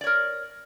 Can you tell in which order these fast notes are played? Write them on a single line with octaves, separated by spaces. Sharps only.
D5 C#5 A#4